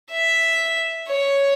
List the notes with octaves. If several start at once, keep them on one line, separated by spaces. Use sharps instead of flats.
E5
C#5